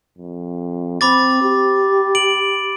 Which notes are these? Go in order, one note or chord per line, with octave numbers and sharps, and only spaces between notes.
F2
C4 B5 D6 A6
G4
D7 F#7